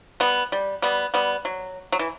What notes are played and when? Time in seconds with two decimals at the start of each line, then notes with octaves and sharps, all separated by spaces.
0.20 G3 B3
0.52 G3
0.82 G3 B3
1.14 G3 B3
1.45 F#3
1.92 F#3
1.99 E3